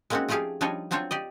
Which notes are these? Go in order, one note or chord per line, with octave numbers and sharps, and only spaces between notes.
G#3 A#3 C4 C#4 D#4 F#4
F3 A3 F4 G4 G#4 F5
F3 G3 D4 D#4 C#5 D#5
F#3 C4 D4 F4 C5 C#5
G4 D5 D#5